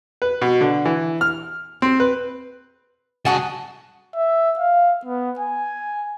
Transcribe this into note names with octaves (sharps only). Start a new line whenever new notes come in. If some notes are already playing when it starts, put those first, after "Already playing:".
B4
B2
D3
E3
F6
C4
B4
C2 F#4 G#4 F#5 A5
E5
F5
B3
G#5